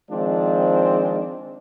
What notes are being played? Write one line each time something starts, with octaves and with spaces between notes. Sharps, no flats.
D#3 F3 G#3 C4 D4 F4